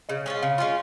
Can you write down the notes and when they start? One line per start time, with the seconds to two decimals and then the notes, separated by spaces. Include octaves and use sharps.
0.09 C#3 D#5
0.26 G#3 C#4 F4
0.42 C#3 F5
0.58 G#3 C#4 F4